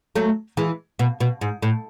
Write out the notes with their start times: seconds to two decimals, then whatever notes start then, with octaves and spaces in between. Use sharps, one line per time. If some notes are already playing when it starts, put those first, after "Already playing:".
0.16 F#3 A3
0.57 E3 G#3
0.99 B2
1.20 B2
1.41 G#2
1.62 A2